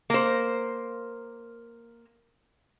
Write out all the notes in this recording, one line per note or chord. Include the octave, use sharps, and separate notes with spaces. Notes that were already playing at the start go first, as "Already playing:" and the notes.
A#3 C5